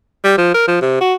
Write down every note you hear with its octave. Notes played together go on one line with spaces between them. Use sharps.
G3
F3
A#4
F3
C3
F#4